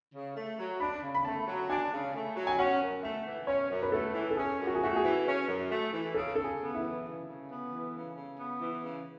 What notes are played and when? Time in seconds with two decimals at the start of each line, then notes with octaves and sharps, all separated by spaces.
0.14 C#3
0.36 A3
0.58 F#3
0.80 D4 B5
1.02 C#3
1.15 B5
1.25 A3 A5
1.47 F#3
1.70 D4 G#5
1.92 C#3
2.14 A3
2.36 F#3
2.47 G#5
2.58 C#4 F#5
2.81 F#2
3.03 A3 E5
3.26 E3
3.47 C#4 C#5
3.69 F#2
3.82 B4
3.92 A3 A4
4.14 E3
4.31 A4
4.37 C#4 G#4
4.59 F#2
4.67 F#4
4.75 G#4
4.81 A3 F#4
4.96 G#4
5.04 E3
5.27 C#4
5.48 F#2
5.71 A3
5.93 E3
6.14 C#3 A4
6.35 C#3 A4
6.44 G#4
6.60 B3
6.74 E4
6.81 E3
7.05 C#3
7.27 C#3
7.49 B3
7.70 E3
7.94 C#3
8.16 C#3
8.37 B3
8.61 E3
8.82 C#3